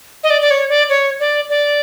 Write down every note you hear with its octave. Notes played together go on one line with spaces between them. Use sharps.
D#5
D5
D5
C#5
D5
C#5
D5
D5